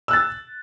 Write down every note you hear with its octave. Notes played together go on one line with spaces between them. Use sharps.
E6 F#6 A6